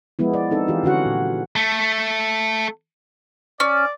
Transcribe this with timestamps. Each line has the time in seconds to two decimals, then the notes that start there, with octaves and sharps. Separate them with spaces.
0.19 F3 G#3 B3 E4
0.34 D5
0.51 C4 D#4 A4
0.68 E3 F4 G4
0.83 D3 C#4 F#4 F#5
1.06 A#2
1.56 A3
3.60 C#4 D5